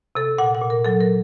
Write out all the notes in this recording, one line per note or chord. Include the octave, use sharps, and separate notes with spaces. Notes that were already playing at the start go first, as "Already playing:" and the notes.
C3 A4
A#2 F#5
F#5
A#2
A#4
F#3 A4
A#4